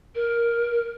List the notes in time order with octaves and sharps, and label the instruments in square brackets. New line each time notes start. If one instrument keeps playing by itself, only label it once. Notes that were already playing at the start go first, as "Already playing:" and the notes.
[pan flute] A#4